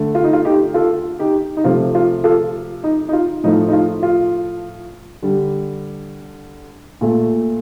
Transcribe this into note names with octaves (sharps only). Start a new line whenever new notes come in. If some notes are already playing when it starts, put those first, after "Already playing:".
Already playing: D3 A3
F4
D#4
F4
D#4 G4
F4 A4
D#4 G4
D#4
C3 F3 A3 F4
F4
F4 A4
D#4
D#4
F4
A2 F3 A3 D#4
D#4
F4
F4
D3 G3
A#2 A3